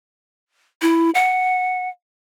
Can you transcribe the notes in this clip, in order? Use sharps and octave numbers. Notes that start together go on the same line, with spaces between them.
E4
F#5